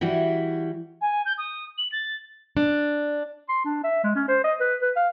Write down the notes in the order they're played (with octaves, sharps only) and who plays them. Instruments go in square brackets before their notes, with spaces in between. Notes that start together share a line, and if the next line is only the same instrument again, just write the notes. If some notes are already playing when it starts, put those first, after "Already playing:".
[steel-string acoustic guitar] E3 G3 E4 F#4
[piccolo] G#5
G6
D#6
F#7
A6
[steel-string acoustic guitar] D4
[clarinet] C6
D4
E5
G#3
C#4
C5
D#5
B4
B4
F5